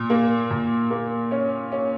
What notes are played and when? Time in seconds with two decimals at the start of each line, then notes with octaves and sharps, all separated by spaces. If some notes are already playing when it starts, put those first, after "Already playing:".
Already playing: A#2
0.10 A#3
0.50 A#2
0.91 A#3
1.31 C#4
1.72 C#4